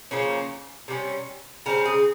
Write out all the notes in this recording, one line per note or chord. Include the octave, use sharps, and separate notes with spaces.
C#3 F3 A#3 C#4
C3 G3 C#4
C#3 G3 C4 A#4
G#4